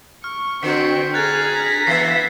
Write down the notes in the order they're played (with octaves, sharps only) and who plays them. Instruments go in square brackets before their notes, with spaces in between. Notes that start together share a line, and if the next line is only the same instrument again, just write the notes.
[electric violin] C#6 [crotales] F6
[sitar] D3 [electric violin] C4 G5 [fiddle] F#4 C5 [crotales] B6 C#7
[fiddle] G#4 A#5 [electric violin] F6 [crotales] F#6 G#6 A6
[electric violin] A#6 B6
[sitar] E3 E5 [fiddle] B3 [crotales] C7